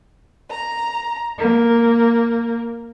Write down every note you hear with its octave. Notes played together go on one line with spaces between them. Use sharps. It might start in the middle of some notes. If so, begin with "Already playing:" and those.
A#5
A#3